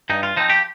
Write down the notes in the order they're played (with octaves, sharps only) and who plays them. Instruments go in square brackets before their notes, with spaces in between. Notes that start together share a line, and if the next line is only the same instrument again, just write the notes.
[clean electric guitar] G2 D#4
F4
F3 C4 D#4
G4